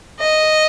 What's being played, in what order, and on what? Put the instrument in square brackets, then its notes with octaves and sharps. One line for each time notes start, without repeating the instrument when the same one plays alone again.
[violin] D#5